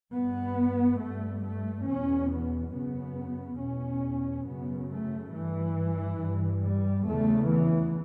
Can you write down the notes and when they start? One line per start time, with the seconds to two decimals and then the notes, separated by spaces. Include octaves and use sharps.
0.14 G2 B3
1.01 G2 A3
1.44 A3
1.87 E2 B2 C#4
2.31 B3
2.74 F#2 C#3 B3
3.60 E2 B2 C#4
4.47 F#2 C#3 B3
4.90 A3
5.33 G2 E3
6.21 G2
6.64 G3
7.06 E2 C#3 A3
7.50 E3